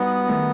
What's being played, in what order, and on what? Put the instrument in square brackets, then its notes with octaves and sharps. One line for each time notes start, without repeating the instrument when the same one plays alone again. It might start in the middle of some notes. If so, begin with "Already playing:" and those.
Already playing: [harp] G3 D#4 F#4 [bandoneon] B3
[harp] D#3 A3 D#4